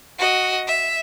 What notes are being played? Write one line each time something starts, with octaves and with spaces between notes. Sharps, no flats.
F#4 D#5
E5